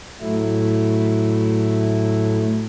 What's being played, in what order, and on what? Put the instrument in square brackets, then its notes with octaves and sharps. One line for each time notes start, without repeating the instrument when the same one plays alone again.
[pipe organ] A2 F#3 A3 E4